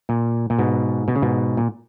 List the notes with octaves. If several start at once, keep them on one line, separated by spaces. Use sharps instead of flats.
A#2
A#2
G#2 B2
B2
C#3
G#2 B2
A#2